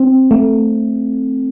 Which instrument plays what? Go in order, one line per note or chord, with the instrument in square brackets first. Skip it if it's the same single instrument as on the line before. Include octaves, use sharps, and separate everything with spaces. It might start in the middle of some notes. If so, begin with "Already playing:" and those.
Already playing: [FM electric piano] C4
A3